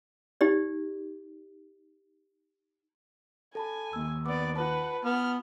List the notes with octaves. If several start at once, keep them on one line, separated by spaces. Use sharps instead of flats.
D#4 G4 D5
A4 G#5 A5 B5
D#2 A#3 E6
B3 D5 D6
F4 B4 F#5 A5
B3 F6